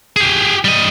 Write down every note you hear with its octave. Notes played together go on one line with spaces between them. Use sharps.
G4 G#4
G3 D#5